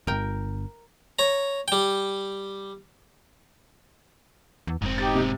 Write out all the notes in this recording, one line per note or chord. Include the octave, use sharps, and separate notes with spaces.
D1 G1 A#4 G5
C#5 A#5
G3 G5
E2
F1 G#2 C4
D#4 G4 A6
C3